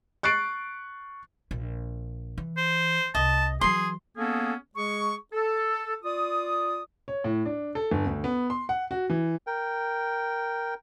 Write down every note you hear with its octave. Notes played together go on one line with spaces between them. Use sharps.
C#6 F#6 A6 C7 D7
A#1
E3
C5
C2 D#5 A5
E3 F#3 G#4 C6
A#3 B3 C#4 G#4 A4
G#3 G#4 C#6
A4
F4 D5 D#6
C#5
A2
D4
A4
G1
D2
B3
C6
F#5
F#4
E3
A#4 G5